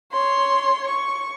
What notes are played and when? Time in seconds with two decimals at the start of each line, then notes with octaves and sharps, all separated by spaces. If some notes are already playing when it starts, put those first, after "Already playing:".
0.12 C#5 C6
0.87 C#6